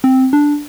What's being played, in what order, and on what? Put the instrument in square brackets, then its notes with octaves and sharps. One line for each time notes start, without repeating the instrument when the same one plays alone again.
[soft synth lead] C4
D4